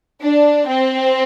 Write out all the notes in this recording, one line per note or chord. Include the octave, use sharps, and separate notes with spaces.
D4
C4